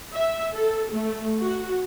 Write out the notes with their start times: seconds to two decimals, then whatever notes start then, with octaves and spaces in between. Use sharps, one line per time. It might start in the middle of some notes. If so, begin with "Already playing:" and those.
0.13 E5
0.53 A4
0.92 A3
1.41 F#4